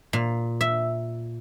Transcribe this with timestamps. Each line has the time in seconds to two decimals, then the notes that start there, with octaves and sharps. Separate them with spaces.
0.13 A#2
0.61 E5